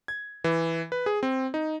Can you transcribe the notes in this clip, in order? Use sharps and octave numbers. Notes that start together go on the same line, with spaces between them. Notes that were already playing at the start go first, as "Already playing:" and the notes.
G#6
E3
B4
G#4
C4
D#4